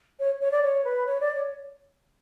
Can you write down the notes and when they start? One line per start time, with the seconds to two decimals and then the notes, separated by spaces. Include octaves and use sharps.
0.19 C#5
0.41 C#5
0.51 D5
0.62 C#5
0.84 B4
1.06 C#5
1.20 D5
1.35 C#5